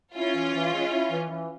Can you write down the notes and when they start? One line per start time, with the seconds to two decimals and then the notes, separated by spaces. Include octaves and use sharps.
0.15 C#4 E4 F4
0.34 E3
0.54 E3
0.73 G#3
0.91 E4
1.11 E3
1.29 E3